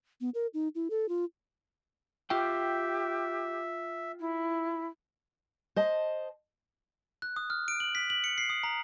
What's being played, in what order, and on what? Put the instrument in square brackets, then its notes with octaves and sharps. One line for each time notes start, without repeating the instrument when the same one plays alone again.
[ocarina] B3
A#4
D#4
E4
A4
F4
[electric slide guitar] F4 G5 [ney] G4 [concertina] E5
[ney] E4
[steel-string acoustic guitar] C5 D#5 A5
[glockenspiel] F#6
D#6
F6
D7
F#7
B6
F#7
C#7
C7
D#6
A#5